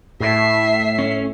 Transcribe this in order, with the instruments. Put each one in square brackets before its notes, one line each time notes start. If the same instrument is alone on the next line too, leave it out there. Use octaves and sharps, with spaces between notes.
[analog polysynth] A2 [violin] E5 C7
[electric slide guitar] C#4